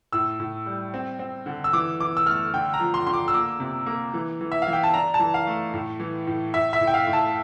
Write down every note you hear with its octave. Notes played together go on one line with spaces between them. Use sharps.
A2 E6
A2
G3
C4
C4
D3
E6
E3 D6
E3 D6
E6
A3 F6
D3 G5
A#5
F3
C6
D3 C6
D6
E6
A#3 D6
C3
A#3
E3
E3
E5
E3 F5
G5
A5
D4 A#5
A5
E3
F5
A3
A2
E3
A2
A2 E5
E5
A2
G5
F5
A2
A5